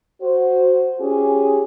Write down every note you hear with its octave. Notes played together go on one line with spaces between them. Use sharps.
F#4 C5
C#4 F4 G4 G#4